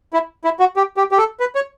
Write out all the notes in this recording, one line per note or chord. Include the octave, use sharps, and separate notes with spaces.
E4
E4
F#4
G4
G4
G4
A4
B4
C#5